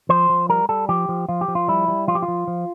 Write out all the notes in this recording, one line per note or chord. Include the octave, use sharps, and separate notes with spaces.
F3 C5
F3
G3 A#4
G3 A4
F3 G4
F3
F3 F4
G4
F3
F4
G3 E4
G3
F3 F4
G4
F4
F3
F3